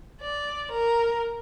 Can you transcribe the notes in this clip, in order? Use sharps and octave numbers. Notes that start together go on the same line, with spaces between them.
D5
A#4